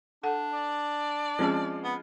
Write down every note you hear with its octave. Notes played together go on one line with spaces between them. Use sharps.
D4 A4 F#5
D5
F3 G#3 C4 C#4 G#4
B3